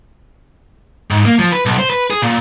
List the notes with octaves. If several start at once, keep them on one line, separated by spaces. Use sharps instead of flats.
G#2
A#3
F3
B4
B1
C5
B4
G#4
A#2